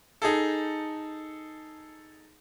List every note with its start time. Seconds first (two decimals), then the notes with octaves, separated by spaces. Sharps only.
0.22 D#4 G#4 A4